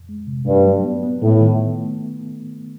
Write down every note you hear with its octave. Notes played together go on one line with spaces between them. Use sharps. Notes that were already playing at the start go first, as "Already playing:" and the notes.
Already playing: F2
G#3
C3
G2 A3
F#3
B3
B3
A2 A3
D#3